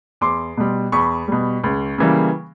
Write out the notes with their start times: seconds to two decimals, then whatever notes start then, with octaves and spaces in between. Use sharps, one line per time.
0.21 E2 C6 D6
0.57 B2 G3
0.92 E2 B5 C#6
1.28 B2 G3
1.64 C#2
1.98 C#3 E3 G3 A#3